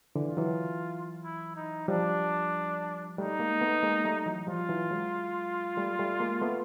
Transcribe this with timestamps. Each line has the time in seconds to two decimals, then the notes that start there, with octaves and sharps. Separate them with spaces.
0.16 D3 E3
0.26 F4
0.37 E3 F#3
1.24 E4
1.56 D#4
1.88 F3 G3 D4
3.18 G3 A3 D#4
3.39 G#3 A#3
3.61 A3 B3
3.83 G#3 A#3
4.05 G3 A3
4.26 E3 F#3
4.47 F3 G3 F4
4.69 E3 F#3
4.91 F#3 G#3
5.77 G3 A3
5.99 G3 A3
6.20 G#3 A#3
6.41 A3 B3